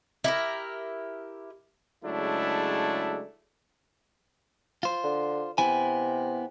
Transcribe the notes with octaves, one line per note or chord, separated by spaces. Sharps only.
E4 G4 A#4
C#3 F#3 G#3 A3 D4 E4
F4 C5
D3
C3 B3 E4 G#5